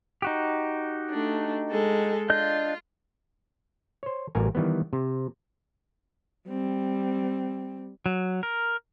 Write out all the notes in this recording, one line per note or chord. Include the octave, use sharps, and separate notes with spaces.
D#4 F#4 G4
A3 D4
G#3 A4
D4 F4 D#5 G6
C5 C#5
A1 G3 F#4 A#4 G#5
D#3 E3 G3 B3
C3
G3 C4
F#3
A#4